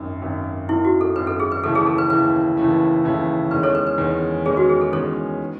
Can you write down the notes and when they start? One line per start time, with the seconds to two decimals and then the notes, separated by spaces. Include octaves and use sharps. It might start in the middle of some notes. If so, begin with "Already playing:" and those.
Already playing: G#1 F#2 D#3
0.22 G#1 F#2 D#3
0.69 G#1 F#2 D#3 E4
0.85 F#4
1.01 A4
1.16 G#1 F#2 D#3 B4
1.27 A4
1.40 G#4
1.52 B4
1.63 D#2 C#3 E3 A3 E4 A4
1.75 G#4
1.86 A4
1.98 B4
2.10 D#2 C#3 E3 A3 E4 B4
2.57 D#2 C#3 E3 A3 E4
3.04 D#2 C#3 E3 A3 E4
3.51 E2 D#3 G#3 C#4 B4
3.63 A4 C#5
3.75 B4
3.87 B4
3.98 E2 D#3 G#3 C#4
4.46 E2 D#3 G#3 C#4 G#4
4.57 F#4
4.69 G#4
4.81 A4
4.92 E2 D#3 G#3 C#4 A4 C#5
5.40 D#3